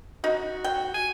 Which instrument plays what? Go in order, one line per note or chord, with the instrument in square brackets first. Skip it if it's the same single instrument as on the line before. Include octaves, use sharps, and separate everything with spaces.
[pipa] D#4 [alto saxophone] F#4
[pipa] G5
[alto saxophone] G#5